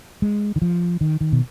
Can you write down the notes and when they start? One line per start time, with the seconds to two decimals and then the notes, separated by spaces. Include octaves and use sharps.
0.22 G#3
0.56 D#3
0.62 F3
1.01 D#3
1.21 D#3
1.32 B2